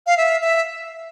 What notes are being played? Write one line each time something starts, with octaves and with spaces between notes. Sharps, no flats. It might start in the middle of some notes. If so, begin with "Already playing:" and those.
F5
E5
E5